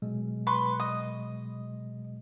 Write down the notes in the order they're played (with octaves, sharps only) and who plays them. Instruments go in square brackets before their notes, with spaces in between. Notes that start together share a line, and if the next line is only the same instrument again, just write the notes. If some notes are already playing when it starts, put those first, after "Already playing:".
[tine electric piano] B2 F#3 G#3
[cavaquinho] B4 C6 C#6
D#5